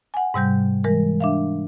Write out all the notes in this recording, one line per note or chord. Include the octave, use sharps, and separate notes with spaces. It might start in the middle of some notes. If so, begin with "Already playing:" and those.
F#5 G#5
G#2 C3 G3 G6
E3 G#3 A#4
D4 E5 F5